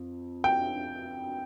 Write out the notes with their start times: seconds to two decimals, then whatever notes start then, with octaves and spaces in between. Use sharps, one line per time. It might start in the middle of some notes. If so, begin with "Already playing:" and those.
Already playing: F2
0.44 G5